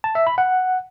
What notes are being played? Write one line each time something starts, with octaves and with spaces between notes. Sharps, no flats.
A5
E5
B5
F#5